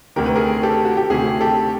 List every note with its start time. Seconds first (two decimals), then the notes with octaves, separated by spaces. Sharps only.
0.16 D2 C3 D#3 A#4
0.26 B4
0.36 G#4 A#4
0.63 G4 A4
0.85 F#4
0.97 G4
1.10 D2 C3 D#3 F#4 G#4
1.41 G4 A4